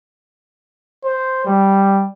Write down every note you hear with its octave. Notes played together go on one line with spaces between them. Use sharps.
C5
G3